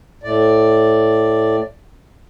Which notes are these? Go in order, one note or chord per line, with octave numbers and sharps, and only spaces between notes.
A2 D5